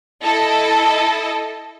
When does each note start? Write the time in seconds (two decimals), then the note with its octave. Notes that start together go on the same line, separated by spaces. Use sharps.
0.23 E4 A4 D#5 A5